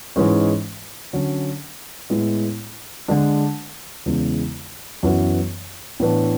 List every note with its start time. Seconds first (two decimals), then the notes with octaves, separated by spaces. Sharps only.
0.16 G#2 E3 G#3 C#4
1.13 D3 F#3 C#4
2.10 A2 G#3 B3 E4
3.08 D3 G#3 D4
4.06 E2 C#3 G#3 B3 E4
5.03 F#2 E3 B3 F#4
6.00 A2 E3 B3 D4